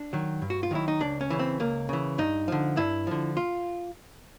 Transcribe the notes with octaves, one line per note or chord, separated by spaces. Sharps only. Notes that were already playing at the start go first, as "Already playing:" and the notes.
Already playing: D4
D#3 F#3
G2
F#4
F4
D#3 F#3 E4
D#4
C#2 D4
C#4
C#3 E3
C4
C#2 A#3
C#3 E3
G2 D#4
D3 F3
G2 E4
D3 F3
F4